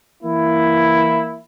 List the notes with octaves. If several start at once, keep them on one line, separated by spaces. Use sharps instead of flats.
E3 A#3 E4